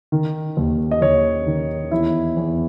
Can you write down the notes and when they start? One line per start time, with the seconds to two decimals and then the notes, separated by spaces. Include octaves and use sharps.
0.12 D#3
0.57 D#2
0.91 D#5
1.01 D#2 C#5
1.46 D#3
1.91 E2 E4
2.36 E2